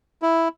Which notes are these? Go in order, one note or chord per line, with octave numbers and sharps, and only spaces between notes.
E4